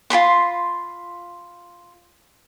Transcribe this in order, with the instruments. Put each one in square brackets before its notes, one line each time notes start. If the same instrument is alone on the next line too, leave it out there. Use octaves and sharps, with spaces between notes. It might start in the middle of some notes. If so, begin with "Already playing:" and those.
[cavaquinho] F4 G#4 B5 C6